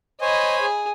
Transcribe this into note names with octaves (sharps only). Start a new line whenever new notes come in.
C5 C#5 D#5 G#5 B5
G#4